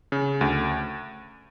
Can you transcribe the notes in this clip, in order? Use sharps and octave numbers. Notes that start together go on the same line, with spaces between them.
C#3
D2